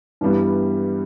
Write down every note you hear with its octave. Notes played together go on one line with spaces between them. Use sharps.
G2 E3 G3 B3